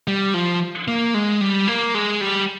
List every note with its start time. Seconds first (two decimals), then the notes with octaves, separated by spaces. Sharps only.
0.07 G3
0.34 F3
0.88 A#3
1.14 G#3
1.41 G3
1.68 A#3
1.94 G#3
2.21 G3